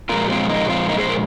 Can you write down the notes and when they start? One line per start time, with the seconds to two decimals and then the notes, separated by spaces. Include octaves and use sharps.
0.09 A#2 F3 G#3 F4 A#4
0.29 C4 F4
0.49 A#3 D#4
0.68 C4 F4
0.88 A#3 D#4
0.98 G#4 C5
1.09 F4 A#4